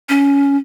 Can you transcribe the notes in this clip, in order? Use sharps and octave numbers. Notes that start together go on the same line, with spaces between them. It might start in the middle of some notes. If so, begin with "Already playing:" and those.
C#4